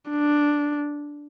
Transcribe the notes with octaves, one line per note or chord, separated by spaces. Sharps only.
D4